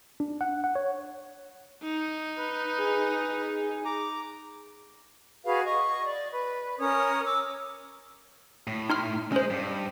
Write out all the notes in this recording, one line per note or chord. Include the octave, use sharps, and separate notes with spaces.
D4
F#5
F#5
C#5
D#4
B4
G#4
A#5 D6
F#4 G#4 B4 F5
D#5 C#6
D5
B4
C#4 A#4 C#5 D#6
D6 E6
A2
D#4 C6 F6
G#3 C#4 C5
G2